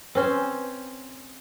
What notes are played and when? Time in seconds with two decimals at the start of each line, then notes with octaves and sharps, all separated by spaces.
0.15 C4 C#4 B4 C5